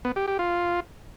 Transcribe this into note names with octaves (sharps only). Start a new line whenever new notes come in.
B3
G4
G4
F4